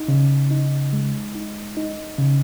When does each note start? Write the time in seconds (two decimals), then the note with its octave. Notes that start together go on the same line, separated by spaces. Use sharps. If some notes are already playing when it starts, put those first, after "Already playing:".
Already playing: D#4
0.08 C#3
0.51 D#4
0.93 G#3
1.35 D#4
1.77 D#4
2.19 C#3